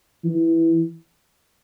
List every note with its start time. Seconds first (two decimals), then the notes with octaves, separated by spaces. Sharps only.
0.24 E3